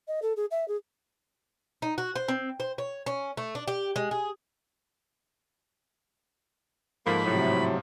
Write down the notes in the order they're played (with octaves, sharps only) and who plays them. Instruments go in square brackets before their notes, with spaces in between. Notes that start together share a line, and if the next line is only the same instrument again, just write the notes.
[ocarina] D#5
A4
G#4
E5
G#4
[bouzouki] D#4
F#4
C5
C4
C5
C#5
C#4
A3
D4
G4
G#3
G#4
[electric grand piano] G#2 F3 [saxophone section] A3 A#3 [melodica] B5
[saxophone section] A2 [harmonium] C3 F#3